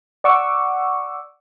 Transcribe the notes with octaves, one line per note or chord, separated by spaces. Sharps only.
D5 F#5 C#6 D6 E6